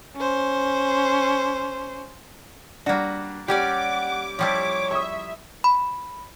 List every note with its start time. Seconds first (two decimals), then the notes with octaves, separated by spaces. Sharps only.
0.17 C#4 C5
2.86 G3 A#3 D4 F#4
3.48 G3 C#4 G4 D5 F#5 D6
4.39 F3 G3 E4 C#5 D6
4.91 E5 C#6 D#6
5.64 B5